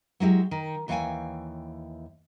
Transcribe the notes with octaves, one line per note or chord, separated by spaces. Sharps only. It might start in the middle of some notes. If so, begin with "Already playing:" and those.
F#3 G#3 E4 G4
D#3
D#2 E3 C#5 F5 G5 G#5